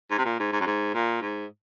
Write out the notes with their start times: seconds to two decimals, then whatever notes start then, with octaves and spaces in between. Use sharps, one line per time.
0.11 G#2
0.18 C3
0.25 A#2
0.39 G#2
0.52 G#2
0.60 F#2
0.67 G#2
0.94 A#2
1.21 G#2